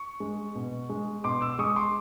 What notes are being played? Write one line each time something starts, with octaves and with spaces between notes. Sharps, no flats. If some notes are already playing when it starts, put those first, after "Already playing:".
Already playing: C#6
G#3
B2
G#3
B2 C6 D6
D6 E6
G#3 C#6 D#6
C6 D6